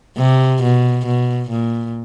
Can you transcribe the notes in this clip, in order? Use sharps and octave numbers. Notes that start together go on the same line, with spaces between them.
C3
B2
B2
A#2